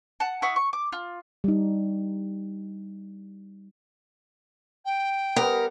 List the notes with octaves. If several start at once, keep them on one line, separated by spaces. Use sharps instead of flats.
F#5 A5
E4 F#5 C#6 D#6
C#6
D6
F4
G3 D#4
G5
G3 B3 A#4